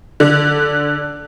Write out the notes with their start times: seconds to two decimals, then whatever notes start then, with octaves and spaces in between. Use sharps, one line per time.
0.20 D3 D4